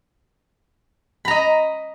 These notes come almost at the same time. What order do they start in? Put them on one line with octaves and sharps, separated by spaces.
B5 A#5 D#5